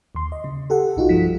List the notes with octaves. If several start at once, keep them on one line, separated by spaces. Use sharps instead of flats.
D#2 C6
D#5
C#3
G4 A4 F#5
B1 D#4 F4 F#4
B1 G2 F3 B6